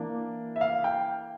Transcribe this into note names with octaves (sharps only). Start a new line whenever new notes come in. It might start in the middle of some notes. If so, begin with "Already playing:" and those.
Already playing: E3 A#3 D4
E5
F5
G5